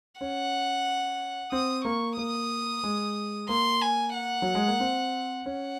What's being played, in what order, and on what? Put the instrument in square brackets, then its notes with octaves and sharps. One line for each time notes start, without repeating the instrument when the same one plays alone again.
[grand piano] C#4 [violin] F#5
[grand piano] C4 [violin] D#6
[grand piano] A#3 [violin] C#6
[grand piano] A#3 [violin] D#6
[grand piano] G#3
[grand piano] A#3 [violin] C6
[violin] G#5
F#5
[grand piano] F#3
G#3
A#3
C4
[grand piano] C#4 [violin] F#5